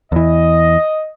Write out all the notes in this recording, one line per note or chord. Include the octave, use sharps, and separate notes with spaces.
E2 E3 D#5